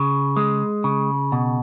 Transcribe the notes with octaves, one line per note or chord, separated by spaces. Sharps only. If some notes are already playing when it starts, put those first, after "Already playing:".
Already playing: C#3
G#3
C#3
B2